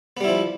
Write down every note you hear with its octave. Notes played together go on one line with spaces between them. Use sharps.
F3 G3 B3 E4